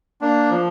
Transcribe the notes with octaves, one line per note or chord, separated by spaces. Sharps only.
A#3 D4
F3